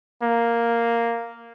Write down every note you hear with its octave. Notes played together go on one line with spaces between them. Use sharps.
A#3